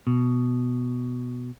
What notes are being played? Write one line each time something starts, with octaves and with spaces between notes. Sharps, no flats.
B2